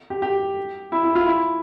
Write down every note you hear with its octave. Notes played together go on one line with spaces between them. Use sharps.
G4
G4
E4
E4
F4
E4